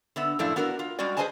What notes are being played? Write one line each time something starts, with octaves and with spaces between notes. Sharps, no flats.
D3 B3 E5
F#2 A2 F3 A3 D4 E4
B3 D4 F#4 A#4 D5
F4
G3 G#3 C#4 F#4 D5
G#4 B4 C5 D#5 G#5 A5